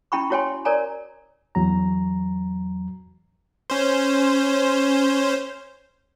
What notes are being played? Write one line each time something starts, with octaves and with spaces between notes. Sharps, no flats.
C#4 E4 G5 B5 C#6
E4 F#4 C#5 G5 G#5 C6
A#4 C#5 D5 G#5 A#5
E2 F#3 A#5
C#4 C5